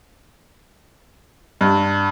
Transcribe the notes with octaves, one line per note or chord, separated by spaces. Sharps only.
G2